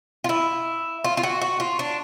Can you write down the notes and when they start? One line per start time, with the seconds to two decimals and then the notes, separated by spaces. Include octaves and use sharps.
0.24 F4
0.29 E4
1.04 F4
1.17 F4
1.23 F#4
1.42 F#4
1.60 F4
1.79 D4